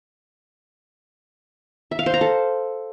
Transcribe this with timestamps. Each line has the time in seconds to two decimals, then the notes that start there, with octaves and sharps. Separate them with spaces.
1.91 E5
1.99 F5
2.06 C5
2.14 A#5
2.21 A4